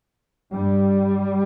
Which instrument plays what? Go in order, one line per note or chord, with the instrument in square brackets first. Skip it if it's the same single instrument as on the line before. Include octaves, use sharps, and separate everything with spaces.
[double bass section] G2 G3